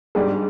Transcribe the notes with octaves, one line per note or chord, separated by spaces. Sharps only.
G#2 G3 D4 G4 G#4 D5